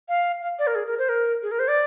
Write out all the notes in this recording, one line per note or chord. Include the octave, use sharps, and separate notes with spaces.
F5
F5
D5
A#4
G#4
A#4
C5
A#4
G#4
A#4
C5
D5